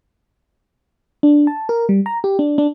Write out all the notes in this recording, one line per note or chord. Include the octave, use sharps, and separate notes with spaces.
D4
A5
A#4
G3
A#5
G4
D4
D4